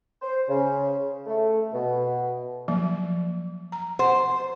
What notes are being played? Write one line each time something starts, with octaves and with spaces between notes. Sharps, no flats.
C5
C#3
A3
B2
F3 F#3 A#3
A#5
C5 F#5